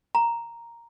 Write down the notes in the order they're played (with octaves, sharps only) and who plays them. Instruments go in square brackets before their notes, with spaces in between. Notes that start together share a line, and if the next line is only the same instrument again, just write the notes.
[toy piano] A#5